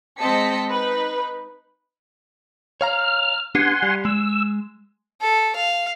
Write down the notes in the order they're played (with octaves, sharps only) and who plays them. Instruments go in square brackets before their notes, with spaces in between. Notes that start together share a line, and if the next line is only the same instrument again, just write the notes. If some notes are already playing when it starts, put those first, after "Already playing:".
[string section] G#3 C4 D#5 A5 B6 C#7
D#4 B4
[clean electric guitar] C#5 F5 A#5 [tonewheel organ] F6
[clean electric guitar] B3 D4 G4 [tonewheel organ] F#5 G#5 C6
[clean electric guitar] G3
[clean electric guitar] G#3 [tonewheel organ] E6
[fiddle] A4
F5